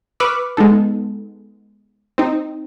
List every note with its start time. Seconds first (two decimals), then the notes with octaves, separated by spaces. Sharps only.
0.20 B4 B5 C#6 D6 E6 F6
0.57 G#3 B3 D#4 A4
2.18 C4 D#4